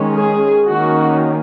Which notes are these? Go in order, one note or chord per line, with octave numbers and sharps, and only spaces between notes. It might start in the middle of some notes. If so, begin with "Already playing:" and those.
Already playing: D#3 G#3 C#4
G#4
D#3 A#3 C#4 F#4